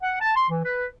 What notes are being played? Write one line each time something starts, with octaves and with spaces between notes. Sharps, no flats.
F#5
A5
C6
E3
B4